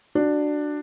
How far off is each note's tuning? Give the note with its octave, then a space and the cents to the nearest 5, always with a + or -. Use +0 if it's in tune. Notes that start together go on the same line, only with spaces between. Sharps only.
D4 +10 F#4 +0